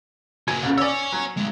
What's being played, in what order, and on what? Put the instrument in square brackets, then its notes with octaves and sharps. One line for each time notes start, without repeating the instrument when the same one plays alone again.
[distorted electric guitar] A#3 F#4 [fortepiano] G#5
[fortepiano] C2 C#3
[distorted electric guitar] C#5 G#5 [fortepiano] D5 E6
[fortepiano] F#3
[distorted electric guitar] G#3 C4